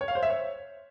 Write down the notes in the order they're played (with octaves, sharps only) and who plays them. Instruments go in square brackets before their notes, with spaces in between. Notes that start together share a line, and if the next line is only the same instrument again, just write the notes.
[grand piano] C#5
F5
C5
E5
C#5